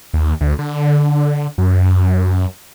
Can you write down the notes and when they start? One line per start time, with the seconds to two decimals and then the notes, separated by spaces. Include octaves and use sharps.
0.14 D#2
0.41 D2
0.59 D3
1.58 F#2